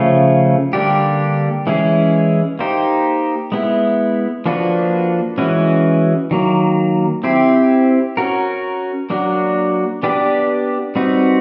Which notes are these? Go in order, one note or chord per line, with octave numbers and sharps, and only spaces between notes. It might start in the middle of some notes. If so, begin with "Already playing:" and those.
Already playing: C#3 F3 A3 C#4
D3 G3 A#3 D4 G4
E3 G#3 C#4 E4 G#4
A#3 D#4 G4 C5
G#3 B3 E4
F3 A#3 D4 F#4 B4
E3 G#3 C#4 F#4 B4
D#3 F#3 A#3
C4 E4 G4 C5
C#4 F#4 A#4
F#3 A#3 D4 F#4
B3 D4 G4 B4 D5
G3 C4 D#4 F#4 B4